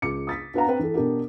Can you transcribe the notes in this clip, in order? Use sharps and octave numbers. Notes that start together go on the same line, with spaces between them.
C#2 F4 D6 C#7
D#6 A6 B6
D4 F#4 B4 F5 F#5 A#5
C4 B4 G5
E3 A4
B2 D4 G4 A#4